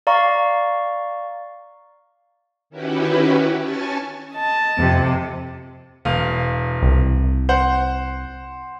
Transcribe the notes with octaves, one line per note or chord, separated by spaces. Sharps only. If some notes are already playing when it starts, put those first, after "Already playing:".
D5 F5 A#5 C#6
D#3 C#4 E4 F#4 G4 B4
C#4 G#5 A5 C#6 A6
D#5 A5
F2 C3
E1 F5
C2
C5 F#5